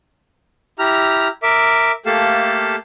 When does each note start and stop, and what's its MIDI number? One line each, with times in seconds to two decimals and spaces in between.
0.79 1.28 64
0.79 1.28 67
0.79 1.28 82
0.79 1.28 89
1.43 1.92 70
1.43 1.92 76
1.43 1.92 86
2.06 2.76 57
2.06 2.76 58
2.06 2.76 67
2.06 2.76 69
2.06 2.76 77
2.06 2.76 81